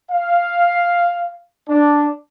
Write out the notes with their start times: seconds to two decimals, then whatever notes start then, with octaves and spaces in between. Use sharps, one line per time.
0.11 F5
1.69 D4